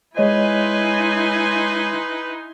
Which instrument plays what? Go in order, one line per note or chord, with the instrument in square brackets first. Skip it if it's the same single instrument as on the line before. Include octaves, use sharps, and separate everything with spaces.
[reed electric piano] G#3 C#5 D#5 [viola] D#4 E4 [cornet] B4 [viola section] G#5 C6